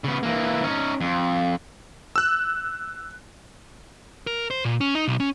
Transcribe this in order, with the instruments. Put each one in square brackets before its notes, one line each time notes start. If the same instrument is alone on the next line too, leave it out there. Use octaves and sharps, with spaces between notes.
[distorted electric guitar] C#3 B3
E3 A#3
C#4 D#4
F2
[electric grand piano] E6 F#6
[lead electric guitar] A#4
C5
A#2
C#4
D#4
B1
C#4